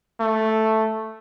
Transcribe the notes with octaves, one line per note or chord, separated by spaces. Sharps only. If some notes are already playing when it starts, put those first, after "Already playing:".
A3